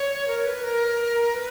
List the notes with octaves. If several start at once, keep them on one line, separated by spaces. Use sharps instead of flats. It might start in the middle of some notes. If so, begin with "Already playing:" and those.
Already playing: C#5
A#4
B4
A#4
B4